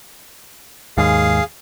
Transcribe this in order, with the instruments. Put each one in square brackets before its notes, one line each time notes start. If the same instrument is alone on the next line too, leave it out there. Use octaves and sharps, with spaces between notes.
[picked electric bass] D#2 G#2 [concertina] G#4 F5